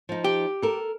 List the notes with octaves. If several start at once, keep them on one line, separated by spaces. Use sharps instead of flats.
F3 D#4
G4
A4 A#4